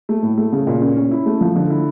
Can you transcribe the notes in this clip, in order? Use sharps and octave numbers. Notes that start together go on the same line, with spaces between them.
A3
A2
A3
C#3
A#2
C#4
C#4
E4
A3
F3
D3
E4